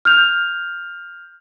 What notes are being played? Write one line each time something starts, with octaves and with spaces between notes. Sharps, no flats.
F6 G6 F7